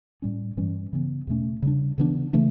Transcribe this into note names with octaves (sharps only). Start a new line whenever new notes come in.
A2 G3 C#4
G2 E3 G3 C#4
C#3 E3 B3
E2 B2 A3 C#4
C#3 G3 D4
C#3 E3 B3 D4
C#3 E3 A3 D4